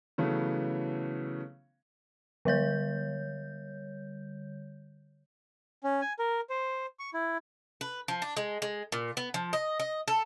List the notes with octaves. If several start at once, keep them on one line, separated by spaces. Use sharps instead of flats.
C#3 E3 F#3 A3 B3
D3 G3 C#5 G6
C#4
G#5
A#4
C5
C#6
E4
B4
F3
D4
G#3
G#3
A#2
B3
F3
D#5
D#5
A4